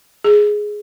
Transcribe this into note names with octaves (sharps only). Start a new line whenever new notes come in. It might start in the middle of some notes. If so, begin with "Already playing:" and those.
G#4